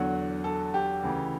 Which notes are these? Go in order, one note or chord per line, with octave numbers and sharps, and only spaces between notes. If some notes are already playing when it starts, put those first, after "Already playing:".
Already playing: E2 D3 F#3 F#5
A4
G4
D2 C#3 E3